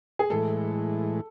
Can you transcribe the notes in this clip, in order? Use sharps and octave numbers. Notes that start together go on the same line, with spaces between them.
G#4
A2 E3 G#3 A4